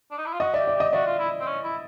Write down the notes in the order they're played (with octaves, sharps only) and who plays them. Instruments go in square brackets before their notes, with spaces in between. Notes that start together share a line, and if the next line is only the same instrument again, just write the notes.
[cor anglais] D4
D#4
E4
F4
[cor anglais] F#4 [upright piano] D#5
[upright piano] D5 E5
[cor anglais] G4
[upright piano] D5
[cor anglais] G4 [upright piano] D#5
[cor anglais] F#4 [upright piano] D5 E5
[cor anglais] F4
E4
C4
C#4
E4